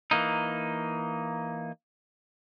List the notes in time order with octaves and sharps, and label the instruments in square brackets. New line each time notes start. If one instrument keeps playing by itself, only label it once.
[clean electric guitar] E3 A#3 D#4